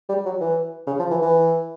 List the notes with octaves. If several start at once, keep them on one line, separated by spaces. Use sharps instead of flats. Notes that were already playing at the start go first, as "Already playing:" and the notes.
G3
F#3
E3
C#3
F3
E3
E3